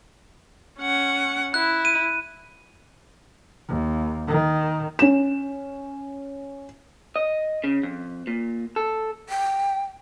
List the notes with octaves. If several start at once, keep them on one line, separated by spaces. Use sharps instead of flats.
C#4 F#5
E4 F#6
D#7
D#2
D#3
C#4 E7
D#5
C#3
F2
A#2
A4
G5